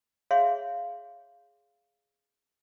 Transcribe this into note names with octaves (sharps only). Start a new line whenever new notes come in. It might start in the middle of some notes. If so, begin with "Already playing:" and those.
G#4 C#5 E5 F5 C6